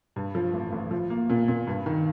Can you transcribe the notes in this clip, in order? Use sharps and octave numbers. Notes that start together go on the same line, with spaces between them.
G2
F3
A1
A1
F3
A#3
A#2
A#2
G2
D#3